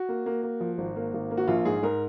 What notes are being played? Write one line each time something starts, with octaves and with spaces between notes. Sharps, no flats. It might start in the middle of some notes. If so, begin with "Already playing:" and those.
Already playing: F#4
A#3
A#3
A#3
F3
G#1
A#3
G#1
A#3
F#4
A#1 F4
G#2 G#4
G#2 A#4